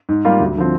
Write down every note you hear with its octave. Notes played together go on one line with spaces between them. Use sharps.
G#2
G3 A#3 F4 A#4
D2
D3 F3 C4